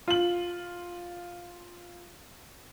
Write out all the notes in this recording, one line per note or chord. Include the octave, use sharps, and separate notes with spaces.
F4 F#7